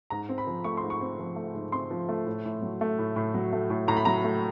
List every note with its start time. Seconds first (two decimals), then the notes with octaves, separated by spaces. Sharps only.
0.10 G#2 A#5
0.29 C4
0.38 B5
0.47 F3
0.64 A3 C#6
0.77 C6
0.83 G#2
0.90 C#6
1.01 C4
1.19 F3
1.36 A3
1.54 G#2
1.72 C4 C6
1.91 F3
2.09 A3
2.26 A2
2.45 A2
2.62 F#3
2.81 A3
2.99 A2
3.16 A2
3.34 F#3
3.53 A3
3.70 A2
3.88 A2 A#5
3.97 B5
4.05 F#3 A#5
4.24 A3